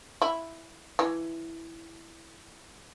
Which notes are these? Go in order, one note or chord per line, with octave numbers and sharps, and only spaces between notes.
E4
E3